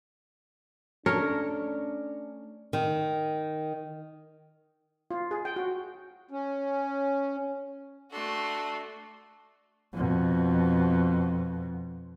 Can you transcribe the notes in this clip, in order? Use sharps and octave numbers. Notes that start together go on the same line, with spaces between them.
A3 C#4 D4 A4 A#4 C#5
D#3
F4
G#4
G5
F#4
C#4
A3 D4 F#4 A4 C6
F2 B2